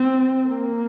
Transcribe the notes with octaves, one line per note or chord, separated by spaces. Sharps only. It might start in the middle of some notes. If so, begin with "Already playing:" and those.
Already playing: C4
A#3